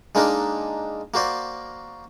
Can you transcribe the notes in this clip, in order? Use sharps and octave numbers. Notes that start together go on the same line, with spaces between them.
G#3 A#3 D4 D#4 A#4
A#3 F#4 C5 D5